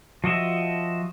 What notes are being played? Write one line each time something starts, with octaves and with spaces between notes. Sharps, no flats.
F3 F#4 D#5 E5